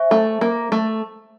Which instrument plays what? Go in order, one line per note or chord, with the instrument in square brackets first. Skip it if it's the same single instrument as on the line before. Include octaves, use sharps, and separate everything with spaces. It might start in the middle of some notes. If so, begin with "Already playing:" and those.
Already playing: [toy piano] C5 E5 G#5 C#6
[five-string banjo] A3
A#3
A3